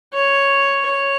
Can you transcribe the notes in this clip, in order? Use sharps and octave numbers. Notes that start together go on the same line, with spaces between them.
C#5
C#5